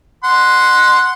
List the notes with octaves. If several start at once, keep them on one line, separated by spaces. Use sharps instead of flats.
F#5 C6